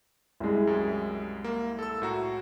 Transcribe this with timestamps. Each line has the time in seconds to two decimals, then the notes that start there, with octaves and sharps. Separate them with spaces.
0.40 C2 G#3
0.67 F#2
1.44 A#3
1.79 A4 E6
2.02 A2 F#4 A#5